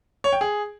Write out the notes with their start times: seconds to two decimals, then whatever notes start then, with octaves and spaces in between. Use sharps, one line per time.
0.24 C#5
0.33 G5
0.41 G#4